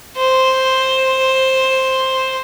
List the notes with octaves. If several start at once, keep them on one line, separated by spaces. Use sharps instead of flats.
C5